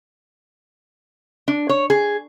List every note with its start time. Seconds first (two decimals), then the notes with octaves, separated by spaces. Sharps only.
1.48 D4
1.69 C#5
1.90 G#4